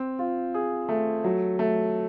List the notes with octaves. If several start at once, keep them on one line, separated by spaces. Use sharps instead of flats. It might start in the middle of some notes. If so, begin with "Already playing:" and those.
Already playing: C4
F4
G#4
A3
F#3
A3